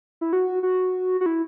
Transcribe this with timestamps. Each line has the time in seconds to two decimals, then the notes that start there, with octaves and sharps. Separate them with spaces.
0.21 E4
0.33 F#4
0.63 F#4
1.21 F#4
1.26 E4